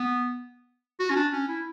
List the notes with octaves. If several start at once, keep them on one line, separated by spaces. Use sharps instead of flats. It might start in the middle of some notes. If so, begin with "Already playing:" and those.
Already playing: B3
F#4
C#4
D4
C#4
E4